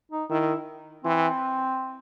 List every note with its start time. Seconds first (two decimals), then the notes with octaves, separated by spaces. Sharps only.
0.12 D#4
0.30 D#3 E4
1.04 E3 C4